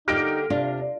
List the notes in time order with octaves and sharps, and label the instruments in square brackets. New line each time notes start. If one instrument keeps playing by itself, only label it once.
[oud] D3 A#3 G4 [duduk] D#4 [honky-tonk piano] F6 A#6 D7
[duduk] C3 [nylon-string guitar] D4 [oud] F4